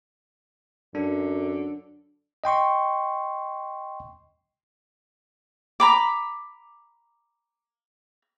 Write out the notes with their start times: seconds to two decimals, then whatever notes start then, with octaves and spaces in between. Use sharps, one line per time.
0.95 F#2 D3 D4
2.44 D#5 G5 C6 C#6
5.80 A#5 B5 D6